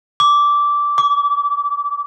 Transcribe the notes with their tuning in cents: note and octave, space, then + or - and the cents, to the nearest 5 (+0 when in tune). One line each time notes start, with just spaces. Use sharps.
D6 -10
D6 -35